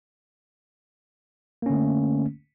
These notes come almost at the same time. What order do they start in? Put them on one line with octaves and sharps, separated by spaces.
A#3 C#4 D3 A3